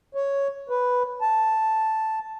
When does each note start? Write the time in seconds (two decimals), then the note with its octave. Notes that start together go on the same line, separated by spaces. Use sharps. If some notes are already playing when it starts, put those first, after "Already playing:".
0.15 C#5
0.70 B4
1.21 A5